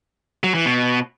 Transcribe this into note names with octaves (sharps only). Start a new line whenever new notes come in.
F#3
E3
B2